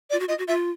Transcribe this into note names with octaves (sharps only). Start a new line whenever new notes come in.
F4 D5
F#4
F4 D#5
F#4
F4 E5